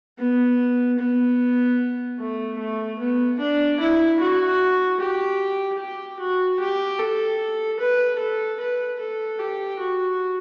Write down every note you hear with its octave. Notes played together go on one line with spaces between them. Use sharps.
B3
B3
A3
A3
B3
D4
E4
F#4
G4
G4
F#4
G4
A4
B4
A4
B4
A4
G4
F#4